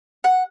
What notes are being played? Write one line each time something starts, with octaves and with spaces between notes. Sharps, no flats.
F#5